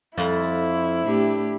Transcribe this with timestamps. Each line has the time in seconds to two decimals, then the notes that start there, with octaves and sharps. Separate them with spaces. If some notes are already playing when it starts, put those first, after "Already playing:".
0.18 F2 E4
1.04 A2 D4 G4